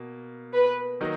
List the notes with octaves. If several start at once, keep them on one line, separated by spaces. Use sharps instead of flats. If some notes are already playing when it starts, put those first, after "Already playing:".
Already playing: B2 A#3
B4
D#3 F#3 A#3 D#4